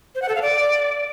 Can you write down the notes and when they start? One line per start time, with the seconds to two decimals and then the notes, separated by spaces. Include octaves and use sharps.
0.15 C5
0.22 F#5
0.29 A4
0.35 F5
0.42 D5